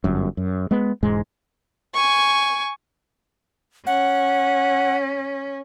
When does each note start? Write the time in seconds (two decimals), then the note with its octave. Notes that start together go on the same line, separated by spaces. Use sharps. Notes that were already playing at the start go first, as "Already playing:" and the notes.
0.04 G1 F#2
0.37 F#2
0.71 G#3 B3
1.03 E1 G#2 G#3
1.94 G#5 C#6
3.87 C#4 F#5